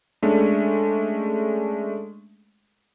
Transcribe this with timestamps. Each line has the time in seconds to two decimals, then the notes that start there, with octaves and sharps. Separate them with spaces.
0.22 G#3 A3 C#4 D4